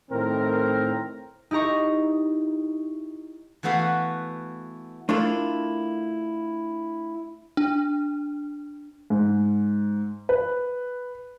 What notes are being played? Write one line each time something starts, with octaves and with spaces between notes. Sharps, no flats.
A2 D#3 C4 A#4
D#4 E4 G4 A#5 C#6
E3 A3 B3 F#4 F5
A3 D4 E4 F4 A4 A#4
D4
G#2
B4